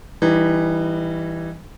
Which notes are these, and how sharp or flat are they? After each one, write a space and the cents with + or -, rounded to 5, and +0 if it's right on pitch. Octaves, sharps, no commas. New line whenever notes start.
E3 +0 G3 +0 D#4 -25